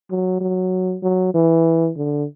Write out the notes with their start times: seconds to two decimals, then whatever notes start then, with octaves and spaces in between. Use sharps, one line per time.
0.10 F#3
0.41 F#3
1.03 F#3
1.34 E3
1.96 D3